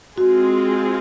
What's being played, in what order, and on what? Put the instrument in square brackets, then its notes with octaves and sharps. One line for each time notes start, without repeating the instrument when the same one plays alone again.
[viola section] G#3 C4 F4 G#4 [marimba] F#4